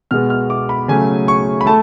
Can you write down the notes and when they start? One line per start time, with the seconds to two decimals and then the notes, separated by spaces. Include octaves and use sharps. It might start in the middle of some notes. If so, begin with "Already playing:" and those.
0.11 B2 G#3 B3 F6
0.30 F6
0.50 D6
0.69 B5
0.88 C#3 F#3 A3 G#5
1.28 C#6
1.61 B5
1.66 A3 A5